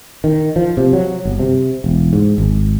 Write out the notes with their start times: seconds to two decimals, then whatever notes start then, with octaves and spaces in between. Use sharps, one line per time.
0.24 D#3
0.56 F3
0.77 C3
0.93 F#3
1.25 G1
1.39 C3
1.84 E1
2.13 G#2
2.38 G#1